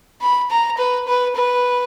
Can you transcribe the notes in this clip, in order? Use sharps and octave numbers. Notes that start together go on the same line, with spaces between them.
B5
A#5
B4
B4
B4